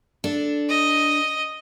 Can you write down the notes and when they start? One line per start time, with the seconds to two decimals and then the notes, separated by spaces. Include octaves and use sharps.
0.24 D4 A4
0.69 D#5